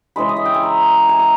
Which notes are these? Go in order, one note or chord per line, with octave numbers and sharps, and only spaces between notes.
C#3 E3 G#3 B5
D#5
E5
G5
G#5
A#5
G#5
A#5